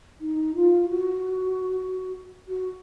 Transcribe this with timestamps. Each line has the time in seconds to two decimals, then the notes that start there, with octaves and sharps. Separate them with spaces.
0.21 D#4
0.55 F4
0.89 F#4
2.48 F#4